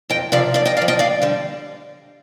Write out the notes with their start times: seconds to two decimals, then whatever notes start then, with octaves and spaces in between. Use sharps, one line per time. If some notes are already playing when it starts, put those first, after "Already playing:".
0.10 F2 D#5 G5
0.32 C3 F3 D5 F5
0.54 F2 D5 F5
0.66 D#5 G5
0.77 C3 D5 F5
0.82 F3
0.88 D#5 G5
0.99 D2 D5 F5
1.22 D3 G3